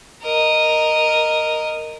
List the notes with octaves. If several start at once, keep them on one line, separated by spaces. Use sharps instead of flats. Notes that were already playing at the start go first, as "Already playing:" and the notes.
A#4 D#5